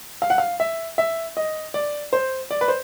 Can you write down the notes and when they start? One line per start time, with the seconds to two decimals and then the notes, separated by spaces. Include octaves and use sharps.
0.22 F5
0.30 F#5
0.38 F5
0.60 E5
0.98 E5
1.37 D#5
1.74 D5
2.13 C5
2.51 D5
2.61 B4
2.68 C5